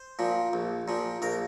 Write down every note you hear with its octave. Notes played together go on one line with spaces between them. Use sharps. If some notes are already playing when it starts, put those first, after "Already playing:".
Already playing: C5
A#2 F3
A#1
A#2 F3
A#1 A#4